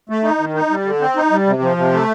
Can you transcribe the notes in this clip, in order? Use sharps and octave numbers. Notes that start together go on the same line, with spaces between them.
A3
D#4
D#3
D#4
G3
D3
C4
D#4
G3
C3
F3
C3
A3